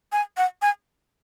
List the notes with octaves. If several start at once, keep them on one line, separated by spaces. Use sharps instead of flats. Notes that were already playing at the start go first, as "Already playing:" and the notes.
G#5
F#5
G#5